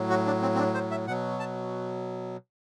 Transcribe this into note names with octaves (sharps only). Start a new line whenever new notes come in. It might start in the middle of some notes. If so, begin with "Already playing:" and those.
Already playing: A2 F#3
F#4
D4
C4
C4
D4
C5
E5
B2 F#3 F#5
A5